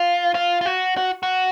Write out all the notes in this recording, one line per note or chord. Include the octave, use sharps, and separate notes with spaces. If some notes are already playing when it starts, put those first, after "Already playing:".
Already playing: F4
F4
F4
F#4
F#4
F#4